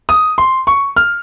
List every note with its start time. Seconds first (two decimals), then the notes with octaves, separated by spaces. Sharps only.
0.09 D#6
0.38 C6
0.67 C#6
0.96 F6